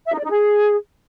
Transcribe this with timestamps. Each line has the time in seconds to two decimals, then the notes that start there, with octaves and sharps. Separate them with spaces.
0.06 E5
0.12 D#4
0.18 D5
0.24 D#4
0.30 G#4